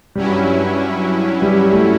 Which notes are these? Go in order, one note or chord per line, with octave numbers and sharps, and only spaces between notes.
G2 F#3 G3 C#4 E4
G3
A3